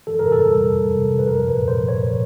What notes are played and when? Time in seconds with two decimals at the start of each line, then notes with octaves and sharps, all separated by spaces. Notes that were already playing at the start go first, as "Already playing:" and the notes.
0.07 E3 A4
0.19 C3 A#4
0.32 A4
0.38 G3
0.52 C3
0.67 G3
0.82 G3
0.97 C3
1.12 C3
1.19 B4
1.28 F3 A#4
1.42 A#2
1.48 B4
1.58 F3
1.68 C5
1.73 F3
1.87 A#2 C#5
2.03 F3